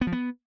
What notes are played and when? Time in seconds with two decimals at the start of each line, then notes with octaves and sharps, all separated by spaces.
0.01 B3
0.07 F3
0.12 B3